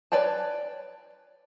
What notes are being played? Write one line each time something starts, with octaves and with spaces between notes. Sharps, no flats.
B4 C#5 D5 G5 A5